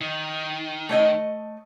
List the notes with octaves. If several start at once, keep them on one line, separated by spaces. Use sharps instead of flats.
D#3
A3 C#5 D#5